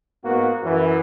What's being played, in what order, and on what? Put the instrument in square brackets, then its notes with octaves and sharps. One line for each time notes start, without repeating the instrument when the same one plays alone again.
[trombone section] G#2 A#3 B3 F#4
F#2 E3